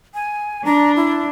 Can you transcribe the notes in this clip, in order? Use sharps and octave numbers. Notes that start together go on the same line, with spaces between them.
G#5
D4 A#5
E4